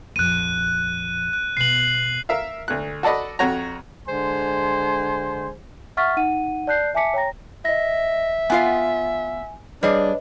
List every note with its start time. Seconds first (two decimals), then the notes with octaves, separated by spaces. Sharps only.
0.16 A#1 F2 F#6 D#7
1.33 F#6
1.57 B2 B3 C7 F#7
2.29 A#4 E5 F5
2.68 D2 F#6
3.03 F#4 A4 D5 D#5 B5
3.39 F2 F#4 C#5 A#5
4.07 D3 G#3 C5 G#5 C6
5.97 E5 F#5 C#6 F6 A6 B6
6.17 D#4 F#5 D#7
6.67 D5 A5 F#6 G6 C7
6.94 E5 G#5 A5 D6 B6 C#7
7.14 C#5 G5 A#5 A#6
7.65 D#5 E5 A#6
8.50 B3 F4 F5 G#5
9.83 G3 D4 G#4 B4 C#5 D#5